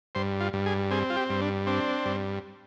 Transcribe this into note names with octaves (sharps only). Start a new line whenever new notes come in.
G2 C5
F4
G2
G#4
C4 G#4
F4
G4
G2
D4
C4 D4
G2